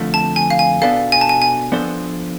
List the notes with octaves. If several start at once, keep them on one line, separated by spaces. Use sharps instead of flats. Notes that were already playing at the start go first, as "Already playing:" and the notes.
Already playing: F2 D3 F3 A3
A5
G#5
F5
G#5
B2 B3 D4 A4 F5
G#5
A5
G#5
G#5
F3 B3 D4 A4 C5